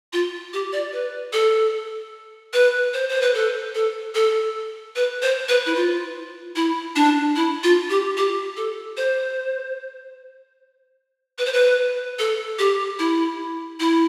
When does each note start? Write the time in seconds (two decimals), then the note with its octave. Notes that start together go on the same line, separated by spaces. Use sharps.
0.13 F4
0.53 G4
0.73 D5
0.92 B4
1.33 A4
2.53 B4
2.93 C5
3.09 C5
3.22 B4
3.34 A4
3.75 A4
4.14 A4
4.95 B4
5.22 C5
5.48 B4
5.66 E4
5.75 F4
6.55 E4
6.96 D4
7.36 E4
7.63 F4
7.90 G4
8.17 G4
8.57 A4
8.97 C5
11.38 B4
11.45 C5
11.53 B4
12.19 A4
12.59 G4
12.99 E4
13.80 E4